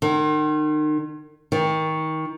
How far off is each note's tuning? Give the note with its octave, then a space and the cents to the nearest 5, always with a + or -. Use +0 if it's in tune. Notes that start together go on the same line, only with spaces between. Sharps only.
D#3 -35
D#3 +25